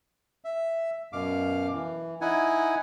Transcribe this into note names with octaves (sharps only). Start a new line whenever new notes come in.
E5
F#2 B2 F5 D6
E3
D#4 E4 F#5 G#5